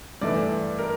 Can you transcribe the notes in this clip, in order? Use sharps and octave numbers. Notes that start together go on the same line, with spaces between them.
G2 E3 A3 D5
A#4